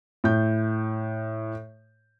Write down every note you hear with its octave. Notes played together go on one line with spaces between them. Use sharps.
A2 G6